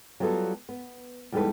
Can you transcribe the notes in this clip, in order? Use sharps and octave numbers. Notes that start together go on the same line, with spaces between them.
F#3 G3 B3 F4 A4
B3
E2 G3 G#3 D#4 A4 B4